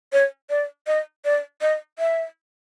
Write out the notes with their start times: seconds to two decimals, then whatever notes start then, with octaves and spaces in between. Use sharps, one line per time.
0.13 C#5
0.50 D5
0.87 D#5
1.25 D5
1.62 D#5
1.99 E5